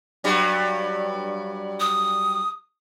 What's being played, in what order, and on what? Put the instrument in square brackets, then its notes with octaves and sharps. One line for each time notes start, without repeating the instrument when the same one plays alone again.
[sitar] G2 F#3 G3
[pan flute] D#6